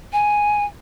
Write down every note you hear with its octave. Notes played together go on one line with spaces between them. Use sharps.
G#5